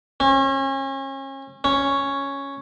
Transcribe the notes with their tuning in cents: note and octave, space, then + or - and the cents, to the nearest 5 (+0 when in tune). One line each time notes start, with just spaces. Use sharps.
C#4 -35
C#4 +0